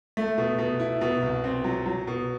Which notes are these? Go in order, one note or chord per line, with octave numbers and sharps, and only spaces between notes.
A3
B2
B2
E4
B2
C2
C4
F#3
F#3
B2